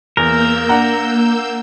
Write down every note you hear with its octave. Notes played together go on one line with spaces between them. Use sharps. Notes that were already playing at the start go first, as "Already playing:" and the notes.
E2 A#3 A#4 E6 G6
D4 F#5 A#5